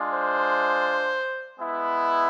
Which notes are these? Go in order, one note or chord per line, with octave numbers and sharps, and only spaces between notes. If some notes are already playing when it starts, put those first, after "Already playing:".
Already playing: G#3 D4 F4
C5
G#3 B3 E4